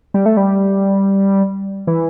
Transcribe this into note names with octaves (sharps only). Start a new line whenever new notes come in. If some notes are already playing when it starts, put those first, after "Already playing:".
G3
A3
G3
E3